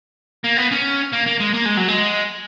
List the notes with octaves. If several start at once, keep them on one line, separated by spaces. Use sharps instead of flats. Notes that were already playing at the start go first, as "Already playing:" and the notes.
A#3
B3
C#4
A#3
A#3
G#3
A#3
G#3
F#3
G#3